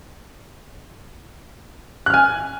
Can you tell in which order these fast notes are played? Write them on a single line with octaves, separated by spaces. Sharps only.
F#6 F6 G#5